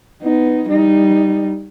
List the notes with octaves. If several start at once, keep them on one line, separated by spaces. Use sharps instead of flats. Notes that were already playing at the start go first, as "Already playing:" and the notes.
B3 D#4
G3 D#4